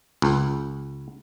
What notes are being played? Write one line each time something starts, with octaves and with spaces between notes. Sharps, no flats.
C#2